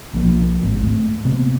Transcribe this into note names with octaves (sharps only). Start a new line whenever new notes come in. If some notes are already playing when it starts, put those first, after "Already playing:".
B1 F3 A#3
G#1 D2 G#2
A3
C3 A#3 B3